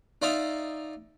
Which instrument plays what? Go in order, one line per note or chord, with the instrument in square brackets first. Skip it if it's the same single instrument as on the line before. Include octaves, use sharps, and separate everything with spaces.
[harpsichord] D#4 F4 D5 E5 F5